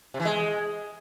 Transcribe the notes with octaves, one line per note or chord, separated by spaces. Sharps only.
C3
E3
G#3